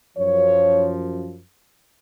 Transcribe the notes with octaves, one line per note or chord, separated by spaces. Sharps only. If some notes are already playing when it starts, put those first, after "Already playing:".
F#2 F3 C#5